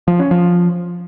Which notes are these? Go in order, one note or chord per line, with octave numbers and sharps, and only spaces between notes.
F3
C#4
F3